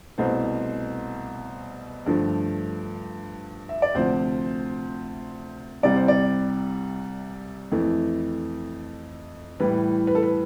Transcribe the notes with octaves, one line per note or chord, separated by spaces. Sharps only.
C2 B2 A3 C5
G2 D3 F3 A3
E5
D5
D2 C3 F3 C5
C2 C3 G3 D5
C5
D5
F2 E3 A3
A2 E3 G3 B4
B4
A4
B4